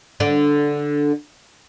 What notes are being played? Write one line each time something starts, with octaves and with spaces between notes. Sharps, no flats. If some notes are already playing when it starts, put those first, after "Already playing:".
D3 D4